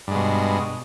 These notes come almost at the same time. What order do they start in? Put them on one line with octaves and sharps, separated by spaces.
G2 G#3 B2